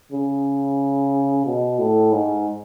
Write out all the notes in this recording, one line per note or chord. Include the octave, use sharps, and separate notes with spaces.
C#3
B2
A2
G#2